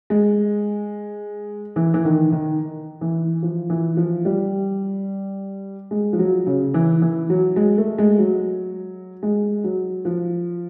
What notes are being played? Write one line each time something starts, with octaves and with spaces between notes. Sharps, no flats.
G#3
E3
E3
D#3
D#3
E3
F3
E3
F3
G3
G#3
F3
F#3
C#3
E3
E3
F#3
G#3
A3
G#3
F#3
G#3
F#3
F3